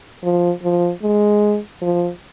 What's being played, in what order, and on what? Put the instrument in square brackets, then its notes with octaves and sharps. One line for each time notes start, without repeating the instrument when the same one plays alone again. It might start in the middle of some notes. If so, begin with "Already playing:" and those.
[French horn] F3
F3
G#3
F3